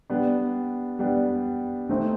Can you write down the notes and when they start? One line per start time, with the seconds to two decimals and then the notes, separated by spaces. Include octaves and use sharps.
0.10 G3 B3 D4
0.99 G3 B3 D4
1.89 A3 C4 D#4